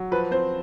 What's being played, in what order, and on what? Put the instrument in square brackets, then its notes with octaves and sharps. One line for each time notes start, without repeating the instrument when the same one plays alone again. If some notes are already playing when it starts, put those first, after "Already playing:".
Already playing: [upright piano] F#3
F3 B4
C4 C5